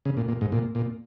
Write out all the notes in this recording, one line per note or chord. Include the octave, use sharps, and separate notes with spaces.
C#3
A#2
A#2
G#2
A#2
A#2